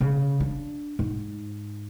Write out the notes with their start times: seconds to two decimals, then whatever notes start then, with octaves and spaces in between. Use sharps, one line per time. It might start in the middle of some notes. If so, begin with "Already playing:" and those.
0.01 C#3
0.40 D4
0.99 G#2